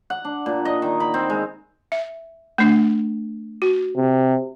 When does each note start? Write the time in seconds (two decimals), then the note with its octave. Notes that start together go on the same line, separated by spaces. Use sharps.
0.10 F#5
0.25 D4
0.46 A#2
0.65 D#5
0.82 D#3
1.00 B5
1.14 C4
1.30 G#3
1.92 E5
2.58 A3 D4
3.62 F#4
3.97 C3